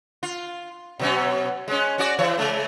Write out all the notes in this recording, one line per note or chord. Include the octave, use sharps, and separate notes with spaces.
F4
B2 F#3 C#4
G#3 C#4
C#4 F#4 D5
E3 C#5
C#3 G#3